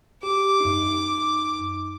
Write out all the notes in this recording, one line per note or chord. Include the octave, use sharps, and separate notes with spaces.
G4 D6
F#2 D#4